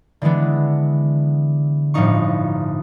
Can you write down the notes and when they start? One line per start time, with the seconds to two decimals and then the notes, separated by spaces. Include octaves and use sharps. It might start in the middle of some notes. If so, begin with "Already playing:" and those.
0.22 D3 E3 G#3 B3 D4
1.94 G1 A2 F3 D4 D#4 C#6